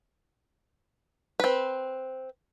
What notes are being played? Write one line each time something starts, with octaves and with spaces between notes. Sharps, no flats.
C4 B4